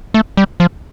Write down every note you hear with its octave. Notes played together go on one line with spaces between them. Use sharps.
A3
G3
F3